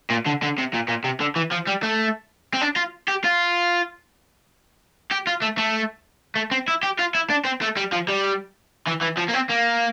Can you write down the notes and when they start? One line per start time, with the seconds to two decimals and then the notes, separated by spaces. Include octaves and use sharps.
0.11 A#2
0.26 D3
0.43 D3
0.58 C3
0.74 A#2
0.89 A#2
1.04 C3
1.21 D3
1.36 E3
1.52 F3
1.67 G3
1.83 A3
2.54 C4
2.62 D4
2.76 F4
3.08 G4
3.24 F4
5.11 G4
5.27 F4
5.42 A3
5.58 A3
6.36 A3
6.51 C4
6.68 E4
6.83 G4
6.99 F4
7.15 E4
7.30 D4
7.45 C4
7.62 A3
7.77 G3
7.93 F3
8.09 G3
8.87 E3
9.01 E3
9.17 F3
9.28 A#3
9.34 C4
9.49 A#3